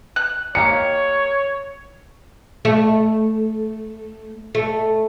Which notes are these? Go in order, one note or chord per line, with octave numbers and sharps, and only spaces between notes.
F#6
A#3 D#4 G4 C#5 C#7
A3
A3